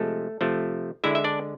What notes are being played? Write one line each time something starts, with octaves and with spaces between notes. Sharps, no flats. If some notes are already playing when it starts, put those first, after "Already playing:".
Already playing: C3 F3 G#3 A3 A4
C3 F3 A3
D3 G#3 E4 E5
E5
D4 D5